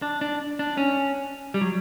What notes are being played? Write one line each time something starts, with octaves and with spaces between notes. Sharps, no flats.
D4
D4
D4
C#4
G3
F#3